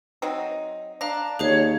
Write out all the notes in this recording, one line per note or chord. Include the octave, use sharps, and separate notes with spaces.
F#3 C4 D#4
D4 F5 A#5 A#6
D#2 G#4 C5 C#5 F5